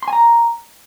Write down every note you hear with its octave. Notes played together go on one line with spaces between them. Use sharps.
C6
G#5
A#5